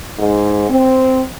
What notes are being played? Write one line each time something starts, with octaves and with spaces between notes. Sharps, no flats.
G#2
C4